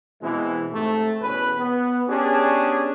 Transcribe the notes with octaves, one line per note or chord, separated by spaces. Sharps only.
B2 E3 G#3 C4 E4
G#2 C3 A3
E2 B2 C#4 B4
B3
B3 C#4 D4 G4 G#4